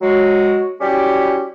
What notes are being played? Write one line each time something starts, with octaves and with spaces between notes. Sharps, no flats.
F#3 G#3 F#4
G3 C#4 E4 F#4 G4